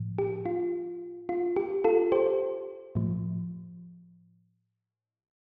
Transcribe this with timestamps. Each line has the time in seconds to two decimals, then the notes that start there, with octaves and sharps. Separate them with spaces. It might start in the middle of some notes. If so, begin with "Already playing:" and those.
Already playing: A2 F3
0.18 G4
0.46 F4
1.29 F4
1.56 G4
1.84 F4 A4
2.12 G4 C5
2.95 A2 F3